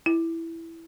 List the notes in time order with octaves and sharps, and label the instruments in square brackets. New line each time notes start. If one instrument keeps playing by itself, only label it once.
[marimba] E4